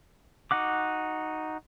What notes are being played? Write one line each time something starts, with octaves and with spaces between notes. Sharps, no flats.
D#4 F#4 F#5 D6